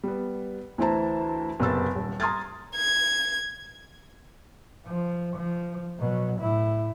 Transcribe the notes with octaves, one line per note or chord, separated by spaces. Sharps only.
G3 B3
D2 E3 E4 C5 A5 A#5
F#1 C3 B3 E6 A6
D#1
A#5 C6 D#6 F6 G#6 A6
G#6
F3
F3
B2 F#3
A2 E4